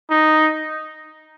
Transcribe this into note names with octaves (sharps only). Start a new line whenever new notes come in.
D#4